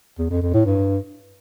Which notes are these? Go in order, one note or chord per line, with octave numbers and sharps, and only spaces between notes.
E2
F2
F2
A2
G2